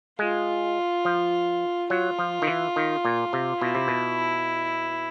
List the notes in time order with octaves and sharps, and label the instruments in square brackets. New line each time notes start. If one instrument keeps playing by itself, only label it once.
[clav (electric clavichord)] G#3 [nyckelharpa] F4
[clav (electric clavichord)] F3
[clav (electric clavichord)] F#3 [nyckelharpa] F4
[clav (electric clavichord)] F3
D#3
E3
D#3
A#2
C3
[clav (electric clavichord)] B2 [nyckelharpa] E4
[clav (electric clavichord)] C3
B2